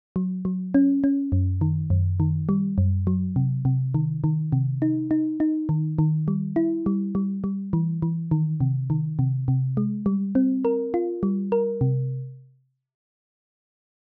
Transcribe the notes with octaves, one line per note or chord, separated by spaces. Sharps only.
F#3
F#3
C#4
C#4
F#2
D#3
F#2
D#3
G3
F#2
F#3
C3
C3
D#3
D#3
C3
D#4
D#4
D#4
D#3
D#3
G3
E4
G3
G3
G3
E3
E3
D#3
C3
D#3
C3
C3
G#3
G3
C4
A#4
F4
G3
A#4
C3